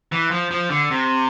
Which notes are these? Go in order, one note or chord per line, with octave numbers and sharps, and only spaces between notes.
E3
F3
F3
D3
C3